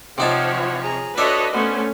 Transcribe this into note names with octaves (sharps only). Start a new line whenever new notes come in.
C3 F3 C4 D#4 C#5 F#5 A5
G#4 A#5
D4 F#4 A4 B4 C#5 D#5 E5
A3 B3 C#4 C5